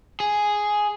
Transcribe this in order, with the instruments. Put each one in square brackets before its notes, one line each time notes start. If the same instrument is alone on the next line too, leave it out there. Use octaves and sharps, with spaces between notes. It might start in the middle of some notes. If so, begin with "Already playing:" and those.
[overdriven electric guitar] G#4